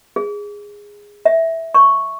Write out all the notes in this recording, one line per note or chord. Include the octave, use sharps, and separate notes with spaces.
G#4
E5
C#6